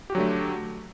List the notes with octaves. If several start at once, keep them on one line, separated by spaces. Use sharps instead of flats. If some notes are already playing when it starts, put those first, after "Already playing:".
D3 F#3 A3 F#4 G4